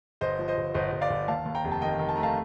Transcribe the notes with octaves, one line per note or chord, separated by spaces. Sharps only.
G1 C5 D#5
F3
C5 D#5
G1
G1 C5 D#5
G1
D5 F5
G1
D#2 F5 A5
D#2
G5 A#5
F1
A5
D#3 D#5 G5
D#3
A5
A3 A#5
F5 A5